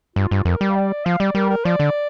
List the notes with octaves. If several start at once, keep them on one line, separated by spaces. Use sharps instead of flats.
G2 F4
G2
F2 A#4
G3
F5
D5
F3 F5
G3 D5
G3 A#4
A#4
F3 D5
D3